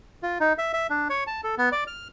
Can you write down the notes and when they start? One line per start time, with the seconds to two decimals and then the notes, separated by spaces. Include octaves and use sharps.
0.23 F4
0.40 D#4
0.58 E5
0.73 E5
0.90 D4
1.10 C#5
1.27 A5
1.44 A4
1.58 B3
1.72 D5
1.87 F6